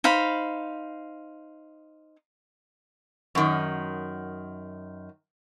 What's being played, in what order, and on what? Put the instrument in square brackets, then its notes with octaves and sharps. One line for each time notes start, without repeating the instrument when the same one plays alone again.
[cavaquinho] D#4 C5 F5 B5
[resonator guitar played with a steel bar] F#2 D#3